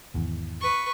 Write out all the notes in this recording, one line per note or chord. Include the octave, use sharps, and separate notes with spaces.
G#1 E2
B4 C#6